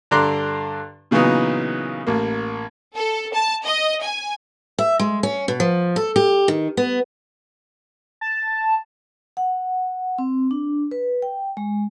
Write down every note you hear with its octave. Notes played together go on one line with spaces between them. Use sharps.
G2 D3 D5 A#5 C6 F#6
A#2 C#3 E3 F#3 B3 D#4
A1 A#3
A4
A5
D#5
G#5
E5
G#3
C#4
B2
F3
A4
G4
D#3
B3
A5
F#5
C4
D4
B4
G5
G#3